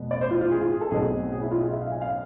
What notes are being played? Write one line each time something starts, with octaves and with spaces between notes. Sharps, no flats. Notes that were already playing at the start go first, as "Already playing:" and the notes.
Already playing: F1 B2 B3
D5
C5
F4
F4
G#4
F4
G#4
A4
B1 B2 A3 C4 G#4
G#4
E4
F4
G#4
E5
F5
G#5
F5